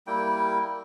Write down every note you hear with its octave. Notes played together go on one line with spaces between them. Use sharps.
G3 A#3 E4 G5